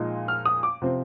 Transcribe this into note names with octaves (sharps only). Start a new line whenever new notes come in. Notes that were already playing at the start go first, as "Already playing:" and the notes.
Already playing: A#2 F3 G#3 D#4
F6
D#6
D6
C3 F3 C4